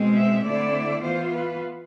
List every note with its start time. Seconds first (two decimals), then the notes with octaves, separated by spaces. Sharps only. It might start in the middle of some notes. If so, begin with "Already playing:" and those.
Already playing: B2 G#3 C4
0.17 E5
0.45 D3 A3 C4 E4 D5
1.02 E3 B3 F4 C5
1.32 B4